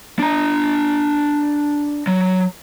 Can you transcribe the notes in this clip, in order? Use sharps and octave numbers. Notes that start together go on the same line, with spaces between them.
D4 A#5
F#3